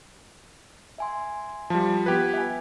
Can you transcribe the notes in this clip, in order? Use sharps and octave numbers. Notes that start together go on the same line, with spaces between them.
E5 G#5 C6
F3 G3 A5
B3 F4 G4 B4 G#6
E5 G#5